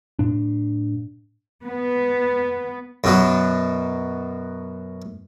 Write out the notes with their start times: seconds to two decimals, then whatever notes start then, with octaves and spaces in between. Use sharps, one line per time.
0.19 A2 D4
1.65 B3
3.04 F#2 B2 F#3